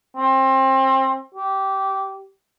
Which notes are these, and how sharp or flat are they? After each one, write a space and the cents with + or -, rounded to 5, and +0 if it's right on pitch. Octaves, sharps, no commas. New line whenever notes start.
C4 +25
G4 -15